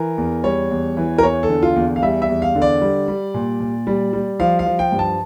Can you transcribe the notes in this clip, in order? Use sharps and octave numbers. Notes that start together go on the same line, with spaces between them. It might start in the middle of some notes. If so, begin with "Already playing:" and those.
Already playing: E3 A#4
E2
G3 C#5
E2
E3
A#4
E2 C#5
A4
D3
F4
E2
F5
G3 E5
E5
E2
F5
D3
D5
G3
G3
A#2
A#2
G3
G3
F3 F5
F5
F3
G5
G2
A5